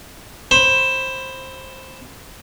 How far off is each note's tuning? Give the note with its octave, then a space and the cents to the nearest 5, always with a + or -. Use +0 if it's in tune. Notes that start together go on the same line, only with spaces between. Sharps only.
C5 +15 B5 +10